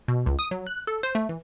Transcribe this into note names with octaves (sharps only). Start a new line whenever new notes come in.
B2
C#2
D#6
F#3
F#6
A4
C5
A3
E3